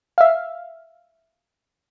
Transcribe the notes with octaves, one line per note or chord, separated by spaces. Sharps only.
E5 F5